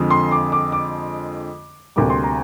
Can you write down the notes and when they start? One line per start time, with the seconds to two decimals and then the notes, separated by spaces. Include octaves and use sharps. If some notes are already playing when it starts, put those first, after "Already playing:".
Already playing: F2 D3 F3 G#3
0.10 C6
0.32 D6
0.52 D6
0.72 D6
1.96 D2 C3 G3 A#3 D6
2.10 C6
2.23 A#5